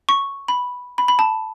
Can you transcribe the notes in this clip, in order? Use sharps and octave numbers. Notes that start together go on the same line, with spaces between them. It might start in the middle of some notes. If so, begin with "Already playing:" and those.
C#6
B5
B5
B5
A5